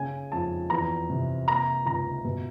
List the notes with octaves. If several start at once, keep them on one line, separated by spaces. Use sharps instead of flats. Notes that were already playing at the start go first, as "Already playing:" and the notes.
Already playing: C#3 G#5
F2 A5
E2 A#5
C3
A#3 A#5
C#2 A#5
B2